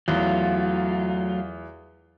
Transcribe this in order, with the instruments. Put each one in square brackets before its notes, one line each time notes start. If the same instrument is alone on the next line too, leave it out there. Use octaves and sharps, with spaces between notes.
[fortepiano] E2 [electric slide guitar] F#3 A3 F4